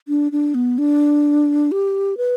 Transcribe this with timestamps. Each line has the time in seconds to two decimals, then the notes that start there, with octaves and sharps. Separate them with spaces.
0.08 D4
0.32 D4
0.54 B3
0.78 D4
1.72 G4
2.17 B4